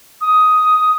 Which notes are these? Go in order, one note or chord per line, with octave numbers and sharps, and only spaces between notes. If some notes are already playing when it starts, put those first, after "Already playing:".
D#6